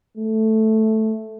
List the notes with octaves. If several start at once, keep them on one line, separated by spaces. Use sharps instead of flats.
A3